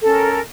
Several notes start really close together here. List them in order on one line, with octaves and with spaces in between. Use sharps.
A4 C#4 A#4